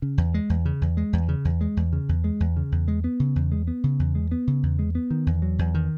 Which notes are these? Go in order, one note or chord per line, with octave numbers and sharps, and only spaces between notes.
C#3
E2
G#3
E2
C#3
E2
G#3
E2
C#3
E2
G#3
E2
C#3
E2
G#3
E2
C#3
E2
G#3
B3
C#3
E2
G#3
B3
C#3
E2
G#3
B3
C#3
E2
G#3
B3
D#3
E2
F#3
E2
D#3